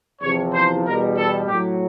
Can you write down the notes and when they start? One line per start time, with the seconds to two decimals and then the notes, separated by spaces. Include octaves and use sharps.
0.21 E2 C3 F3 C#5
0.52 C5
0.84 E2 B2 G3 A#4
1.16 A4
1.47 A2 F#3 G4